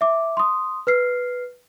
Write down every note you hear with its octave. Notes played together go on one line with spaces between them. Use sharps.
E5 D6
C6 D#6
B4 F6 C7